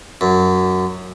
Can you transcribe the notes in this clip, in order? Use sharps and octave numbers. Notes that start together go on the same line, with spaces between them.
F#2